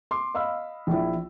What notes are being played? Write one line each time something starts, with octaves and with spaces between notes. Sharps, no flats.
C6 D6
D#5 F5 B5 E6
A#1 E4